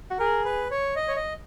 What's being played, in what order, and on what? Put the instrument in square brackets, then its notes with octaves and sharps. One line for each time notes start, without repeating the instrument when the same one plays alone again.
[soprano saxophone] F#4
[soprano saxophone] G#4 [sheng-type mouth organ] A#4
[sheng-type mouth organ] B4
C#5
D#5
C#5
D#5